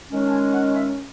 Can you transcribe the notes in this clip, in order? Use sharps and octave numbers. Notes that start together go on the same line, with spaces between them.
D#3 G#3 C#4
A5
G#5
F#5
E5